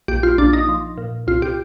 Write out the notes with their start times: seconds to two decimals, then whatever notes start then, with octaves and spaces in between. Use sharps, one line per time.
0.08 A#1 G4
0.23 F4
0.38 A#1 D4
0.53 D#4
0.68 F3
0.98 A#2
1.27 C2 F4
1.42 G4